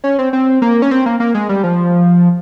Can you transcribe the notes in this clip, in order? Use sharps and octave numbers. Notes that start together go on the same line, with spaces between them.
C#4
C4
C4
A#3
C#4
C4
A#3
A#3
G#3
G3
F3